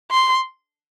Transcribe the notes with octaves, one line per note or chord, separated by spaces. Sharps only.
C6